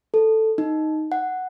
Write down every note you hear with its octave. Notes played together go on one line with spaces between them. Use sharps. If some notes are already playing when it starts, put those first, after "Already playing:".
A4
D#4
F#5